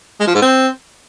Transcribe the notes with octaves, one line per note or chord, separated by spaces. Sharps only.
G#3
F3
G#2
C4